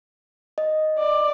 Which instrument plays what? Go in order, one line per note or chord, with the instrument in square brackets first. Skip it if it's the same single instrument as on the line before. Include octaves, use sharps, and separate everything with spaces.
[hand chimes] D#5
[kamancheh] D5